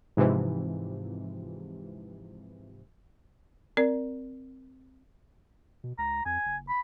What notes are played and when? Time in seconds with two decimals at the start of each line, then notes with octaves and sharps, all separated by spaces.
0.17 G#2 C3 E3 F3
3.77 C4 A#4 D5
5.84 B2
5.98 C#2 A#5
6.25 F2 G#5
6.45 F#1
6.69 B5